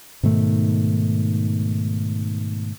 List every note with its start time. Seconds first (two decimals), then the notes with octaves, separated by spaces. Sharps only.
0.23 G#2 B2 D#3 A3